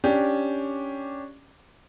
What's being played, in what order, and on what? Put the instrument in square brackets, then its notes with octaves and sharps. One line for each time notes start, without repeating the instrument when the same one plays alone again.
[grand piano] C#4 D4 G4